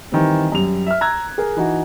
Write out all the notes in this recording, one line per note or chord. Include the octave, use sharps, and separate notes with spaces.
D#3 E3 G3 C4
F#2 G3 F7
E5 F6
A#5 E6 F#6 G#6
G#4 A#4
E3 D#4 F#4